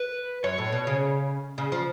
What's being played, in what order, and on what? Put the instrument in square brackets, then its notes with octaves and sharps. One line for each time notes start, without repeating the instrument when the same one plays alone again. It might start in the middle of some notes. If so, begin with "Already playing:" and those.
Already playing: [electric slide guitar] B4
[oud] F#2 [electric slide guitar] C#5
[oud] A2
B2
C#3
C#3
F3